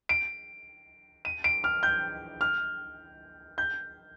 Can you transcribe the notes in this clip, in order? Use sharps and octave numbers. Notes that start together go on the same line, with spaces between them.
D7
D#7
D7
F6
G6
F6
G6